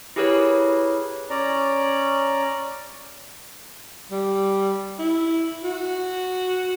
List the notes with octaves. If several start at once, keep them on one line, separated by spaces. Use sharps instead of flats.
E4 G4 G#4 A#4 B4 C#5
C#4 D5 A#5
G3
E4
F#4